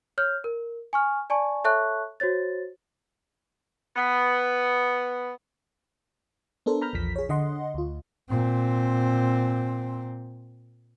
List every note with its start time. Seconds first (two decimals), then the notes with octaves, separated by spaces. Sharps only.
0.18 C#5 F6 G6
0.44 A#4
0.93 G#5 C#6 F6
1.30 D5 G#5 A5 C#6
1.64 A4 C#5 E5 A5 C#6 F#6
2.20 F#4 C5 C#5 A6
3.96 B3
6.66 B3 D4 A4 A#4 C5
6.82 A#5 B5 F6 G6 A#6
6.93 A#1 E2 F3 B6
7.16 G#4 C#5
7.29 D3 D#5 F#5 C6
7.74 D2 F4
8.30 A#2 C4